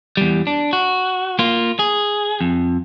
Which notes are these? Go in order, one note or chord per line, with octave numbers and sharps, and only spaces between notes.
E2 G3
D4
F#4
A#3 F4
G#4
F2